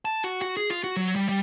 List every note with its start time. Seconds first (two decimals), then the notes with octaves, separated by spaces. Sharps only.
0.05 A5
0.24 F#4
0.42 F#4
0.57 G#4
0.70 F4
0.84 F#4
0.97 F#3
1.16 G3
1.29 G3